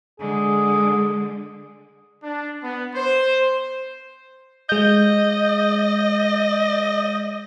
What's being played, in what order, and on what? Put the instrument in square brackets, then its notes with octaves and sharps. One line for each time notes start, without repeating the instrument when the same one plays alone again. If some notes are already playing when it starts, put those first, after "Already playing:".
[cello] D3 G#3 [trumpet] G#4
[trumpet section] D4
B3
C5
[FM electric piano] G#3 G6 [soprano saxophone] D#5